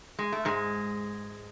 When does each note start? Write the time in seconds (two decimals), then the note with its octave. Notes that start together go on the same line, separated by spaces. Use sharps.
0.19 G#3
0.32 A3
0.45 G#2 G#3